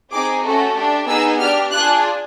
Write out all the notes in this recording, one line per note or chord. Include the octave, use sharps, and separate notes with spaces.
C4 D#4 G#4 D6
A3 C#4 F#4 A4
D4 G4
B3 D#4 G#4 E6
D4 G4 F6
D4 F4 G#4 F#6